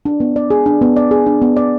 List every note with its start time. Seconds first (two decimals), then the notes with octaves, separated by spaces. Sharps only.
0.05 D4
0.20 B3
0.36 D5
0.50 G#4
0.66 D4
0.81 B3
0.96 D5
1.11 G#4
1.26 D4
1.42 B3
1.57 D5